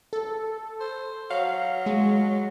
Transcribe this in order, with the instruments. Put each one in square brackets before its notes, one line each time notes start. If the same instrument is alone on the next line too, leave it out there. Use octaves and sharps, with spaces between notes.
[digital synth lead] A4
[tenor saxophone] C5
[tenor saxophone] F#3 [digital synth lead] F5
[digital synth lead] G#3